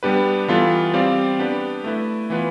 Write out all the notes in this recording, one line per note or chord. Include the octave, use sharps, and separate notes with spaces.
G3 B3 D4 G4 B4
E3 G3 B3 F4 A4
G3 C4 G4 D5 F5
B3 D4 G4 B4 D5
A3 E4 B4
E3 B3 F4 B4